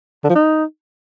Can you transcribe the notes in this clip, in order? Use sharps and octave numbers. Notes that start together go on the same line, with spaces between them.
D3
F3
D#4